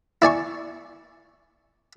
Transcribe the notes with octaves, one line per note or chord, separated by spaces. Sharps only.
E4 D5 G#5 C#6